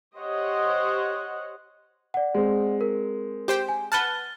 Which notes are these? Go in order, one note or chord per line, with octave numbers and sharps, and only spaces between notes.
G4 C5 C#5 D#5 F#5
D5 F#5
G#3 C4
A#4
G4 C5 G5
G#5
B4 F#5 A5 F6 A6 G7